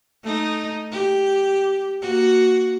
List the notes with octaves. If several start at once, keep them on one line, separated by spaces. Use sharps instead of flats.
A3 D#4
G4
A#3 F#4